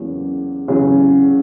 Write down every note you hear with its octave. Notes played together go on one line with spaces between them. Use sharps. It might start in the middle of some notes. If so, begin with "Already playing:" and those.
Already playing: E2 C#3 F#3 A#3
E2 C#3 F#3 C#4